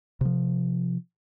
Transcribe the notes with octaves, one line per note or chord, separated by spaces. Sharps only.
C3 F3